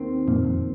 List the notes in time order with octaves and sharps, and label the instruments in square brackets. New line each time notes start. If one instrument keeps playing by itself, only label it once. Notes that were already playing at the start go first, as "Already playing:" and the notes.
Already playing: [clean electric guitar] D#2 D#3 C4
[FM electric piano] F2 A#2
F2